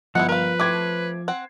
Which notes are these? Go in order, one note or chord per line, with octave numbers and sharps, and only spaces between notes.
G1 F3 G#3 B3 E4 F#5
A#4 B4 F5
A3 C4 D6 G#6
C4 F#5